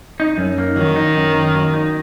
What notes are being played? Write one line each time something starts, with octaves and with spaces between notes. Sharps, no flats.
D#4
F#2
A#3
D#3 F#3
D#4
F#2
A#3
F#3
D#4